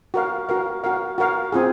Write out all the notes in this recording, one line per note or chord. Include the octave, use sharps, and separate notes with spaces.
F#4 A#4 F5
F#4 A#4 F5
F#4 A#4 F5
F#4 A#4 F5
C4 F4 G#4